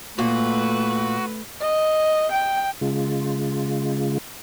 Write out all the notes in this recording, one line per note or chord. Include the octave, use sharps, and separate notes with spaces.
A#2 A3 F#4 B4
D#5
G5
C#3 G#3 F4